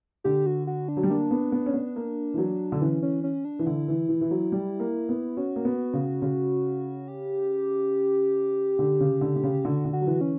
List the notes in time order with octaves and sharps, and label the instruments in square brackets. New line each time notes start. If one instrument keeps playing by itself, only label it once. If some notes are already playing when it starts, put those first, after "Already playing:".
[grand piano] D3 [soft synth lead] G4
[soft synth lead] F#4
F#4
D4
[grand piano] F#3
G3
[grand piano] A#3 [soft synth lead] D4
[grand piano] B3
B3
C#4
B3
A#3
E3
F#3
D3
[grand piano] E3 [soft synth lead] C#4
[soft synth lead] C#4
C#4
D4
[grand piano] E3
[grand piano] D3 [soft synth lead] E4
[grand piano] E3
E3
E3
F#3
G3
A#3
B3
[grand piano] C#4 [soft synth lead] F#4
[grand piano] A#3
B3
C#3
C#3
[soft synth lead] G4
[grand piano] D3
C#3
D3
D3
C#3
[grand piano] D3 [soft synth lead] F#4
[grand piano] D3
[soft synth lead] F#4
[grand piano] F#3
E3
[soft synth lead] C#4